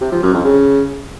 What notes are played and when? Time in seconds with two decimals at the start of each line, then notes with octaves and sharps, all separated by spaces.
0.01 C3
0.12 F3
0.23 F#2
0.34 F2
0.44 C#3